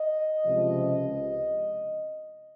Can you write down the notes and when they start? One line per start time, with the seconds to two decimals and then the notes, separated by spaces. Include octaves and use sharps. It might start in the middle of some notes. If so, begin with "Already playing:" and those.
Already playing: D#5
0.45 C#2 C3 F3